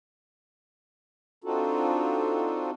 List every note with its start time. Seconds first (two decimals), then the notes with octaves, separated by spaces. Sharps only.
1.44 C4 D4 D#4 F4 F#4 A4